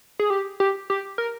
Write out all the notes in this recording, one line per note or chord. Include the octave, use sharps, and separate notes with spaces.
G#4
G4
G4
G4
A#4